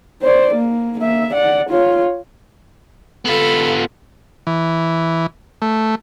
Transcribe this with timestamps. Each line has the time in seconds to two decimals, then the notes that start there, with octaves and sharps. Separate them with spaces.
0.23 C5 D5
0.54 A#3
1.00 A#3 E5
1.33 D5 F#5
1.70 F4 C#5
3.25 B3 F4 A4 B5
4.47 E3
5.62 A3